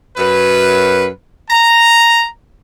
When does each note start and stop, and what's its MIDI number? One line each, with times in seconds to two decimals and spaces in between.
0.17 1.08 42
0.17 1.08 71
1.50 2.23 82